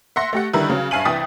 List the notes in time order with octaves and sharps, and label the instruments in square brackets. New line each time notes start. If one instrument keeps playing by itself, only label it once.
[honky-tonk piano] E5 F#5 C6 A#6
A3 G4 F#5
D3 D#3 G3 E4 A#4 B4
C#3 F#3
G2 E5 F5 G#5 D#7 F#7
C2 E3 G5 D#6 A6 B6